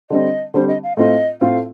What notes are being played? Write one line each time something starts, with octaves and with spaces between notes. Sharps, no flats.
D3 G3 C4 D#5
D3 G3 C4 C5
D#5
F5
A2 A3 C4 F4 D#5
A2 A3 C4 F4 F5